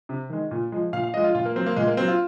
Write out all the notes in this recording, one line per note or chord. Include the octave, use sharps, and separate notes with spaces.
C3
D#3 G#3
A#2
F3 G#3
A#2 F5
F5
F3 G#3 D#5
F4
A#2 F4
A#3
F#3 C4
A#3
A#2 G#3
A#3
F#3 C4
F4